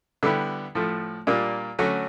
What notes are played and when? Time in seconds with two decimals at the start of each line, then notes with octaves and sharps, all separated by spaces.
0.23 D3 G3 B3 E4 G4
0.75 A2 F3 A3
1.27 A#2 G3 A#3 D4
1.79 D3 F#3 A3 C#4 F#4